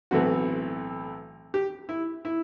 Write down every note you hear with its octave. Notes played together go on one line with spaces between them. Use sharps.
B1 A2 E3 A3 C4 F#4
G4
E4
E4